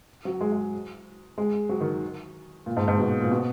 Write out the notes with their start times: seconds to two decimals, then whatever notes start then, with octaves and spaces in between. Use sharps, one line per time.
0.25 F#3
0.41 G#3
0.52 G#3
1.38 G#3
1.69 F#3
1.81 D#3
2.66 A#2
2.76 G#2
2.88 G#2
2.98 B2
3.21 A#2
3.31 B2